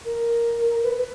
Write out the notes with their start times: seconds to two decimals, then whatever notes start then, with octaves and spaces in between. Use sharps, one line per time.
0.05 A#4
0.83 B4
0.98 B4